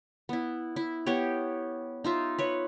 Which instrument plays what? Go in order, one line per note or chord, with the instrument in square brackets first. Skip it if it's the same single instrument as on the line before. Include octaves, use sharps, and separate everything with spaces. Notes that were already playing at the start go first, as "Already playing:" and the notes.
[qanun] B3 E4
E4
B3 G4 C#5
D#4 F4 E5
B4 C#5